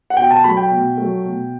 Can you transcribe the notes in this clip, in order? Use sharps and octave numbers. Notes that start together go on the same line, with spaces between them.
F#5
B2 G5
A5
F#3 A3 B5
G5
B2
F#3 A3
B2